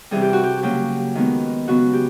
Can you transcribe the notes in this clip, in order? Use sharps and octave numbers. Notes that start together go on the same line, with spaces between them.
C3 E3 G3 G#4
G4
F#4
G4
C#3 F#3 A#3 G4
D#3 G#3 B3
C#3 F#3 B3 F#4
G4